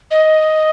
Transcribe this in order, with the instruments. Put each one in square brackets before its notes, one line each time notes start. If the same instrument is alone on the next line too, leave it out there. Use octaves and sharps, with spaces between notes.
[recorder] D#5